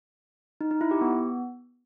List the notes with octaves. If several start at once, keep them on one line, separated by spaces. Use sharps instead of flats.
D#4
D#4
E4
G4
B3